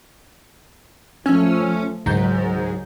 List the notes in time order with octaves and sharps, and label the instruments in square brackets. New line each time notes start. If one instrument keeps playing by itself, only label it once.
[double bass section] F3 A3 [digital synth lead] C#4 [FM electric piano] G#5 E6 F6
[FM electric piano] C#2 A#5 G6 [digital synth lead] G#2 [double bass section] D#3 F#3